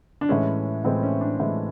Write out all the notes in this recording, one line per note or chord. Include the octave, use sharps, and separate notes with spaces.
D4
A2 E3 G#3 C#4
A2 E3 G#3 C4
C#4
D4
A2 E3 G#3